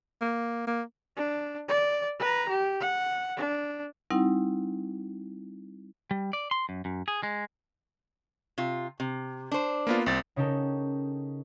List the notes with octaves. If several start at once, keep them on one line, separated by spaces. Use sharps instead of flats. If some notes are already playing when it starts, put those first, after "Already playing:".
A#3
A#3
D4
D5
B4 A#5
G4
F#5
D4
G3 C4 D#4 E4 F#5
G3
D5
C6
F#2
F#2
G#4
G#3
C3 F4
C3
D4 C5
A#3 B3 F4
C2 C4 A6
C#3 C#4 D#4 G4 A4 A#4